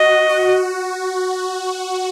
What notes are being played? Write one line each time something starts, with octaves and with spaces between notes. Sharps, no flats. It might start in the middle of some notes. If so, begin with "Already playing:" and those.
Already playing: F#4 D#5
F#4